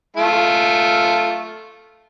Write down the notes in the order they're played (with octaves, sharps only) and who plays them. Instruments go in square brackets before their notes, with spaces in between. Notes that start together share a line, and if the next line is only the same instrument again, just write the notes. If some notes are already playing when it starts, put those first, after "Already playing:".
[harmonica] A3 F4